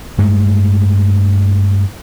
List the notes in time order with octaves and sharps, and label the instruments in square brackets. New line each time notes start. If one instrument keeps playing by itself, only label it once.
[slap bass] G2 G#3 A3